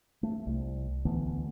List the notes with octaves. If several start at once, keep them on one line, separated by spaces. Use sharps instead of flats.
A3
C2
D2 E3 A3 B3